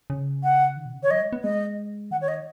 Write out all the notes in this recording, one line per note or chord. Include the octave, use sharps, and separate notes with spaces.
C#3
F#5
D#3
B2
C#3
D#3 C#5
F#3 D#5
G#3
B3
G#3 D#5
D#3 F#5
C#5
D#5